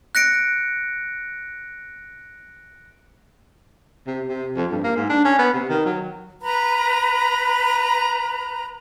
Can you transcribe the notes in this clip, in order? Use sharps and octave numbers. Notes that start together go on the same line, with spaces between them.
F#6 A#6 C#7 D7
C3
C3
F2
G2
A#3
G#2
D4
C#4
B3
C3
D#3
F#3
B4 A#5 B5